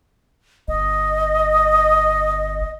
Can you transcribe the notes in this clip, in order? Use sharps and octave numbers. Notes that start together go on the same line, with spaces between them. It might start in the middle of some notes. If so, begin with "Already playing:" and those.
G1 D#5